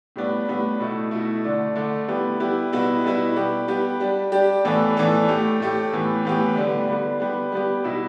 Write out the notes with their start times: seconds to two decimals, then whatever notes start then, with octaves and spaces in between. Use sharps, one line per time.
0.16 A2 G3 B3 D4
0.48 A2 G3 B3 D4
0.80 B2 A3 E4
1.11 B2 A3 E4
1.44 D3 A3 D4
1.75 D3 A3 D4
2.08 G3 B3 E4 G4
2.40 G3 B3 E4 G4
2.73 B2 G3 B3 E4
3.04 B2 G3 B3 E4
3.36 G3 B3 G4
3.68 G3 B3 G4
4.00 G3 D4 G4
4.32 G3 D4 G4
4.65 A2 E3 B3 D4 A4
4.97 A2 E3 B3 D4 A4
5.29 A2 A3 G4
5.60 A2 A3 G4
5.92 A2 E3 B3 G4
6.25 A2 E3 B3 G4
6.56 D3 G3 B3
6.88 D3 G3 B3
7.20 G3 B3 G4
7.52 G3 B3 G4
7.84 B2 G3 E4